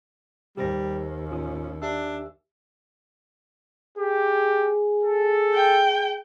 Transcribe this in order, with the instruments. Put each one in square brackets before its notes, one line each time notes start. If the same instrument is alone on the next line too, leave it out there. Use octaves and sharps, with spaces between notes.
[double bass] D#2 [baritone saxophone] G3 [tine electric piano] G4 C5 A#6
[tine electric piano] A1 F4 D#6 [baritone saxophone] C#4
[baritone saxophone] D4 [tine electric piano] G4 E5 E6
[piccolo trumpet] G4 [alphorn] G#4
[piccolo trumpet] A4
[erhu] G5